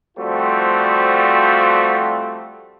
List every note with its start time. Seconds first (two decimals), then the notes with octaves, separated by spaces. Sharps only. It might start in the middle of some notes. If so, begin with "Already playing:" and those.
0.18 F3 G3 A3 C4 F4 F#4